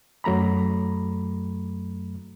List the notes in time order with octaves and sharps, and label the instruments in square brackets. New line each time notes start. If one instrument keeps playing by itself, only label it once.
[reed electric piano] F#2 F#3 A3 A#5 B5